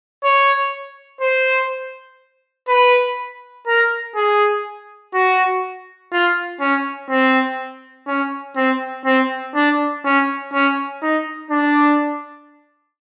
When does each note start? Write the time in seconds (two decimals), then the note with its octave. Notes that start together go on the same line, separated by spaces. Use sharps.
0.24 C#5
1.21 C5
2.68 B4
3.67 A#4
4.16 G#4
5.14 F#4
6.12 F4
6.60 C#4
7.10 C4
8.07 C#4
8.56 C4
9.05 C4
9.55 D4
10.05 C#4
10.53 C#4
11.02 D#4
11.51 D4